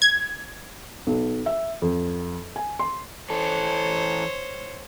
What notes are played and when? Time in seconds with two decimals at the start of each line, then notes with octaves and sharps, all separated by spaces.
0.02 G#6
1.07 B1
1.46 E5
1.82 F2
2.56 G#5
2.79 C6
3.30 E3 A4 C5 C#5